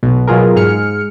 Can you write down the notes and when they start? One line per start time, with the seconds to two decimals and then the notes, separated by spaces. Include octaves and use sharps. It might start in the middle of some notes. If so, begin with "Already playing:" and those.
0.03 B1 B2
0.27 B2 F#3 F4 G#4 A#4
0.56 G#2 G#4 F6 C#7